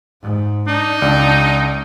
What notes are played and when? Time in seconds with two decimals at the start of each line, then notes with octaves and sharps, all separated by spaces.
0.22 G#2
0.67 D4 D#4
1.02 C#2 D5